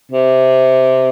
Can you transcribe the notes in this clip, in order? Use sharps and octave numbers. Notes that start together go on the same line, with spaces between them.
C3